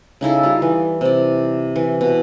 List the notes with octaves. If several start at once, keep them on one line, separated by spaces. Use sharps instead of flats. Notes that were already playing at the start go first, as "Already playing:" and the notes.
C#3 D#4 E4 A4
G3 F4
E3
C3 D5
E3
B2